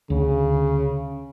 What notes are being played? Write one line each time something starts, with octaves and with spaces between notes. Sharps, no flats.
D2 C#3